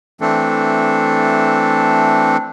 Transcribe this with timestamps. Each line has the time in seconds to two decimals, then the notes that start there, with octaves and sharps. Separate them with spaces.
0.21 E3 A3 C4 D4 A4